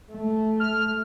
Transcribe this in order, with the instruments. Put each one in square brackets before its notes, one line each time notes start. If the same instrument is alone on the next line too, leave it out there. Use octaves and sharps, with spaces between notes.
[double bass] A3
[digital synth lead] F6